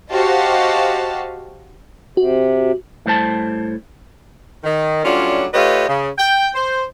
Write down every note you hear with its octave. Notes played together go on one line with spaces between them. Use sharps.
F#4 G4 C5 D#5 F5 A5
C3 F#4
A2 G3 C5 A5
D#3
F#3 G3 A3 C#4 D4 F4
A3 F4 G4 B4 C#5 D#5
C#3
G5
C5